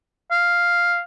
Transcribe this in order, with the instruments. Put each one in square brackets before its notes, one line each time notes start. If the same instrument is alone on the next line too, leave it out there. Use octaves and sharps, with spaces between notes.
[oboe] F5